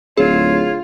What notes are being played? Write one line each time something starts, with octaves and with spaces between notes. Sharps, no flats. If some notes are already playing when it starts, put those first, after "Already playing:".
D1 F4 G#4 C#5